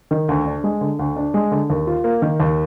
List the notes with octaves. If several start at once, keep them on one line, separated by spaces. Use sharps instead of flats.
D#3
D2
D4
G#3
D3
D2
D4
G#3
D3
D#2
F4
A#3
D#3
D#2